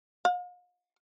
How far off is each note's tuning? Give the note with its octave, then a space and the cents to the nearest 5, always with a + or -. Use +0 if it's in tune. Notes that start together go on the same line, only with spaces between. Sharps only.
F5 +45